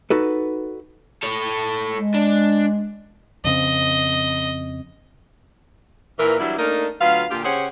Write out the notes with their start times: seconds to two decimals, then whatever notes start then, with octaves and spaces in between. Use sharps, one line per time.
0.10 D#4 F#4 A4 B4
1.23 A4 C#5
1.94 G#3
2.15 D4
3.44 F2 C#3 C4 D#5
6.19 A#2 E3 A#4
6.40 E3 F#3 G3 D4 E4
6.58 A3 A#3 D4 D#4 A#4
7.00 D2 F#3 F4 B4 F5
7.30 A#2 D3 F4 G4
7.45 C#3 G4 G#4 C5 C#5 F#5